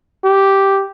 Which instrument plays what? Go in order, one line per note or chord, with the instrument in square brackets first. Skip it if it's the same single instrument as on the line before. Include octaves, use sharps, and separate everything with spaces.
[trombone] G4